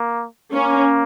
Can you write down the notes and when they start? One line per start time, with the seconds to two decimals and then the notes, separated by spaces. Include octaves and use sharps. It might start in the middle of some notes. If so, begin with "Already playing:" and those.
Already playing: A#3
0.53 A#3 C#4